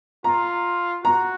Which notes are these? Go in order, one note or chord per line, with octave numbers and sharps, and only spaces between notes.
F4 A#5
F#4 A#5